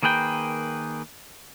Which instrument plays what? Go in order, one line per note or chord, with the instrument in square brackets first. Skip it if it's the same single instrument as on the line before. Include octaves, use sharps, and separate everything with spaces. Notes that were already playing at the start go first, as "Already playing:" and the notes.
[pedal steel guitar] D#3 A#3 G#4 B4 G5